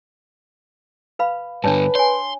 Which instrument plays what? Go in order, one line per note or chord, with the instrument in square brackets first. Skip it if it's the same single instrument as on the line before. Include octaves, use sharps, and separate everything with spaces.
[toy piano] B4 F5 B5
[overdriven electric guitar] G2 D3 [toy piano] D4 C#5 A5 [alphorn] B4
[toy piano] C#5 G#5 [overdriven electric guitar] C6